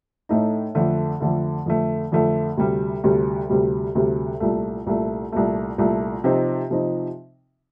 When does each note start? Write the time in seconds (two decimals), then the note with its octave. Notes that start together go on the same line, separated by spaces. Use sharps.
0.29 A2 A3 D#4
0.75 F2 D3 A3
1.20 F2 D3 A3
1.66 F2 D3 A3
2.12 F2 D3 A3
2.57 D2 C3 G3
3.04 D2 C3 G3
3.49 D2 C3 G3
3.95 D2 C3 G3
4.40 C2 A#2 A3
4.87 C2 A#2 A3
5.32 C2 A#2 A3
5.78 C2 A#2 A3
6.24 C3 F3 C4 D#4
6.70 C3 F3 C4 D#4